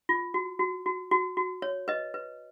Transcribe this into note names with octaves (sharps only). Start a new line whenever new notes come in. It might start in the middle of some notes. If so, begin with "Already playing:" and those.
F4
F#4
F#4
F#4
F#4
F#4
C#5
B4 D#5
B4